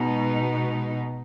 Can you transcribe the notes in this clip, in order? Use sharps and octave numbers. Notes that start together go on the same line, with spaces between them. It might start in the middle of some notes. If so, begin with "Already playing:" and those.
Already playing: B2 G#3 D#4